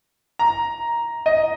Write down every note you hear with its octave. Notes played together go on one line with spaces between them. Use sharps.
A#5
D#5